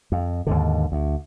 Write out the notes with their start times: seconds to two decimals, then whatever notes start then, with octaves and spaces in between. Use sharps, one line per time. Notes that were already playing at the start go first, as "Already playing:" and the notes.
0.12 F2
0.47 D#2 G#2 D3
0.92 D2